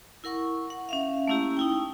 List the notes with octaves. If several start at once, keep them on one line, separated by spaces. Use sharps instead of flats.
E4 A#4 F#5 C#6
F#5
C#4 E5 F5
A3 A#3 C#4 E4 G4
D#4 E4 G5